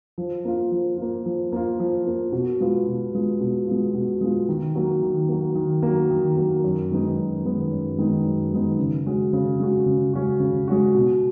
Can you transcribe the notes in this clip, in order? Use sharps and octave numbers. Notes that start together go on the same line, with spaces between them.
F3
A#3 F4
F3
A#3 F4
F3
A#3 F4
F3
A#3 F4
B2
G#3 B3 F4
B2
G#3 B3 F4
B2
G#3 B3 F4
B2
G#3 B3 F4
D#3
F#3 A#3
D#3
F#3 A#3
D#3
A#3
F#3
D#3
F#3 A#3
F#2
D#3 G#3 B3 D#4
F#2
D#3 G#3 B3 D#4
F#2
D#3 G#3 B3 D#4
F#2
D#3 G#3 B3 D#4
C#3
G#3 C#4 F#4
C#3
G#3 C#4 F#4
C#3
G#3 C#4 F#4
C#3
G#3 C#4 F#4
B2